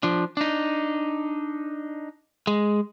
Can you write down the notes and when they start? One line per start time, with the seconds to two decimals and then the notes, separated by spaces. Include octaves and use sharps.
0.03 F3 D4
0.37 D4 D#4
2.47 G#3